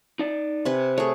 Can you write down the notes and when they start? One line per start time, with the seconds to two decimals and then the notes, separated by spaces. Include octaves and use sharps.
0.19 D#4 D5
0.65 C3 B4 G#5
0.98 A3 G#4 C#5